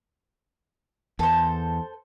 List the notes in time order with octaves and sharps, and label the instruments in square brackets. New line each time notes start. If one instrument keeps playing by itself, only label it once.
[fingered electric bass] E2 [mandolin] A4 C5